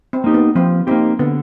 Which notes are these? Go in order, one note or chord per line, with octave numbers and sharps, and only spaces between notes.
C4
A#3 D#4 G4
B3
F3 C4
A#3 C4 D#4 G4
D3 B3